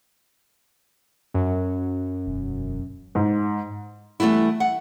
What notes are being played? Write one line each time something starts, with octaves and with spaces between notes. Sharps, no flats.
F#2
E1
G#2
E3 G3 A3 B3 E4
F#5